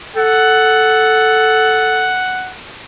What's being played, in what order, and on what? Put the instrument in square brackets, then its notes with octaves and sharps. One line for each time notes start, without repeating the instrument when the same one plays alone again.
[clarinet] A4 [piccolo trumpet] F#5